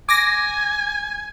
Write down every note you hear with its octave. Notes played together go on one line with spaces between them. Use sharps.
G#5 D6 A#6